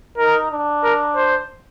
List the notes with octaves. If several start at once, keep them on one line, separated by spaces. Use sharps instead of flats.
D#4 A#4
D4
A#4
C5